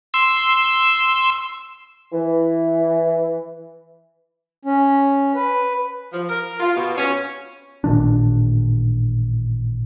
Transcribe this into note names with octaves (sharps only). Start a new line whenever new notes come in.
C6 E6
E3
C#4
B4
F3
A#4
F4
B2
C#4
A1 A#2 D#3 D4